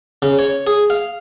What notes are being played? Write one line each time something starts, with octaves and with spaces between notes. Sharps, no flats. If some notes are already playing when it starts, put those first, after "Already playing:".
C#3
C#5
G#4
F5